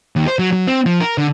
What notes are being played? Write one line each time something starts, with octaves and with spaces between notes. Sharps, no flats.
D#2
C5
F#3
F#3
C4
F3
A#4
D3